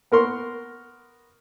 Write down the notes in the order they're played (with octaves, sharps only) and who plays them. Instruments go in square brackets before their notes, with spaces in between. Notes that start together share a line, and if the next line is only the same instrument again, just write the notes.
[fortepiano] B3 A#4 C6 C#6